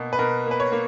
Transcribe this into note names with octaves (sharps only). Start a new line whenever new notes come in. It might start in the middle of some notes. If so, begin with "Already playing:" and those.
Already playing: B2 A#3
B4
B2 A#4
A#3
B4
C#5
A#3